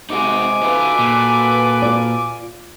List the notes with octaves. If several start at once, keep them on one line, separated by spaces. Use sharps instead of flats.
C3 G#3 D#4 F#4 G#5 D6
D#4 F4 F#4 A4 B4
A#2
F4 D5